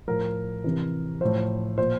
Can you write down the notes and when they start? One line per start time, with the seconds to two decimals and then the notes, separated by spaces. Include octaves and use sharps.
0.08 A2 F3 A#4
0.64 C3 E3
1.21 A2 F3 C5
1.78 A#2 F3 C5